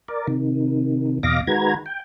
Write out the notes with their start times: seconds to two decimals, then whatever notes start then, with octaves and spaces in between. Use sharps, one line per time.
0.08 A#4 D5
0.27 C3 D#3
1.23 E2 B2 D#5 F5 D6 A#6
1.47 D#3 G#3 F#4 B4 A#5 G#6
1.86 G5